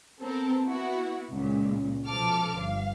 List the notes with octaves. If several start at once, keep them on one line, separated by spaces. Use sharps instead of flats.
B3 C4 A4 A#4
B3 E4 F#4
C#2 A#2
B2 F3 A4 D6 F6
G1 F5